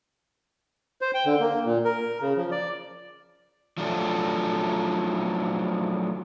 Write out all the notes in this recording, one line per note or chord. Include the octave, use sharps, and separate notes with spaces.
C5
G5
D3
A#3
A#2
A#4
C#3
F3
D5
F3 F#3 A3 D4